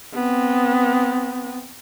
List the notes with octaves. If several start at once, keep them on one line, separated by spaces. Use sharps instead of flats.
B3 C4